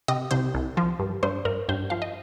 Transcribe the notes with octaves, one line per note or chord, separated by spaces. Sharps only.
C3 D#5
C2 C5
C2
F3
G2
G2 C5
G2 A#4
G2 C5
F3 F5
D#5